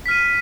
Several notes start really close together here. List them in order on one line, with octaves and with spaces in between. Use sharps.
B6 F6 D#7